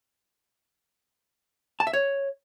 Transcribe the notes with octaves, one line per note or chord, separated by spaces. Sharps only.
A5
E5
C#5